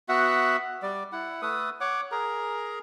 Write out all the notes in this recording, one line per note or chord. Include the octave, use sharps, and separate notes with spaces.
B3 F#4 E5 F#5
G3 D5
E4 F#5
A3 A4 B4 D#6
C#5 F#5 D6
G#4 A#4 A#5